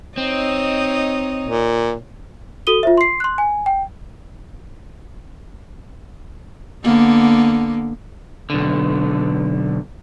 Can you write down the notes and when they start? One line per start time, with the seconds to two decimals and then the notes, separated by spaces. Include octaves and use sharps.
0.17 C4 D#4 C#5 D#5
1.43 A#2
2.67 F#4 A4 D#6 D#7 G7
2.83 F4 C5 E5
2.98 C6 C7
3.20 C6 F#6
3.38 G#5
3.66 G5
6.84 D3 A#3 B3
8.50 B1 D3